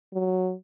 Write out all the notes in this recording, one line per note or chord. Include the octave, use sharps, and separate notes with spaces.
F#3